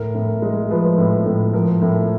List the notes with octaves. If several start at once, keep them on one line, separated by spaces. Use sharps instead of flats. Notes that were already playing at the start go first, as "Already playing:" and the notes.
Already playing: A2 A#4
A2
G#3
F3 B4
A2
A2
F3 A#4
A2